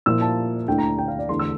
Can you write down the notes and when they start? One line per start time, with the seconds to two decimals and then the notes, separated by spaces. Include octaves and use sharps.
0.06 A#2 F3 A#3 E4 E6
0.21 A5
0.67 D2 D3 A3 E4 G5
0.78 A#5
0.99 G5
1.08 F5
1.19 D5
1.29 E2 D3 A3 C6
1.40 E6